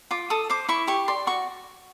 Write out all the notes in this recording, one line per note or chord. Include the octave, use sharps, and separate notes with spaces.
F4 D6
A4 D#6
C5 D6
E4 C#6
G4 C#6
D5 C6
F#4 C#6